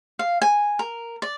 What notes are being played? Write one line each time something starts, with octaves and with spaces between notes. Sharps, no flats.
F5
G#5
A#4
D5